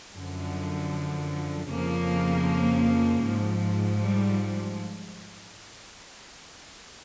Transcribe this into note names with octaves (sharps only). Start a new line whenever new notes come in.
F#2 D3 F3
F2 C#3 F3 A#3
G#2 F3
G3